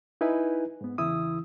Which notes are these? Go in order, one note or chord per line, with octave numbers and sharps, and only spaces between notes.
D#4 E4 B4 G#5
G#2 B3
E2 C#3 E3 E4 D#6 E6